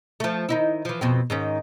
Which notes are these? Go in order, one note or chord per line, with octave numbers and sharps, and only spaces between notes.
F3 A3
D#3 D#4 E4
E3 F3
F2 B2 C4
G#2 D#3 C#4